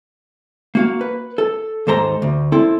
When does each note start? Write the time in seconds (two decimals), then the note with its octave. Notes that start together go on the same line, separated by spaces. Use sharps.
0.75 A#3 F#4 F5
1.01 B4
1.38 A4
1.87 D#2 G#2 A4 C5 A#5
2.22 D2
2.52 C4 E4 A4